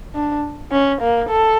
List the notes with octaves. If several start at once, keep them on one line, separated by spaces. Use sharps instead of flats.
D4
C#4
A#3
A4